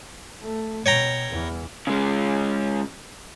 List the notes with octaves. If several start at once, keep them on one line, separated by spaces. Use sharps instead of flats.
A3
B2 C#5 G5 A#5
E2 E3
C#3 G#3